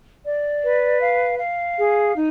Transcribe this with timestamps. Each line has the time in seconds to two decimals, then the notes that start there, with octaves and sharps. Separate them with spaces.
0.24 D5
0.62 B4
1.00 F5
1.39 F5
1.77 G#4
2.15 D#4